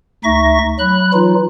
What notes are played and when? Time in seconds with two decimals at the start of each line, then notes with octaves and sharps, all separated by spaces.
0.24 D2 D#4 E5 C#6 A#6
0.79 F#3 B5 F#6
1.13 E3 F#3 D#4 F4